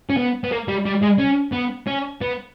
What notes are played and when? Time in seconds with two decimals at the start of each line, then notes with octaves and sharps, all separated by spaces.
0.10 C#4
0.17 B3
0.44 B3
0.52 A#3
0.68 G3
0.86 G3
1.03 G#3
1.20 C#4
1.53 B3
1.87 C#4
2.21 B3